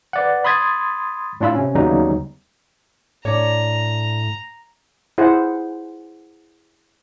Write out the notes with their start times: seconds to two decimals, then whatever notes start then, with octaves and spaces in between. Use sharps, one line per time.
0.13 B4 D5 F#5
0.44 B5 C6 D#6 G#6 A6 B6
1.41 A2 D4 F4 B5 E6
1.55 C3 C#4
1.75 D#2 C#3 F#3 G3 B3 D#4
3.25 A2 D4 C#5 A#5
5.18 E4 G#4 C5 F#5